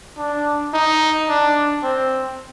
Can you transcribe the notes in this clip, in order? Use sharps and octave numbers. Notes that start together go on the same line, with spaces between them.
D4
D#4
D4
C4